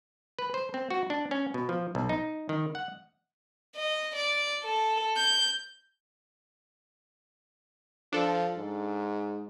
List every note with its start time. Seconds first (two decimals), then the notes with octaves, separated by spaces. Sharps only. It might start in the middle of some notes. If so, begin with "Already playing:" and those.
0.39 B4
0.54 C5
0.74 C4
0.90 F#4
1.10 D4
1.31 C#4
1.54 B2
1.69 F3
1.95 B1
2.09 D#4
2.49 D#3
2.75 F#5
3.76 D#5
4.16 D5
4.63 A4
5.17 G6
8.13 F3 D4 A4
8.57 G#2